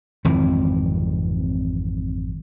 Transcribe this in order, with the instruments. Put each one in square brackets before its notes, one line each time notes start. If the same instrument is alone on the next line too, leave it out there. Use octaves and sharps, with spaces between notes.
[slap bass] G#1 F2 C3 E3